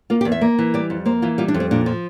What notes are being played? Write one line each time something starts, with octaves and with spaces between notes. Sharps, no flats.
A#3 F4
G4
E2
E5
A#3
E3
G3 D5
F2
A#3 C5
E3 F4
G3 F4
D4
F2
C4
A#2 D4
F3